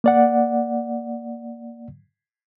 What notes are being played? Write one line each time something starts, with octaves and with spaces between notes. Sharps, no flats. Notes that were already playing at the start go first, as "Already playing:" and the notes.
A#3 D5 F#5